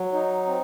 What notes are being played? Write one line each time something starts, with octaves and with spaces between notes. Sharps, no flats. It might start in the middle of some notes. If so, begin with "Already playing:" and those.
Already playing: F#3
D#4
C4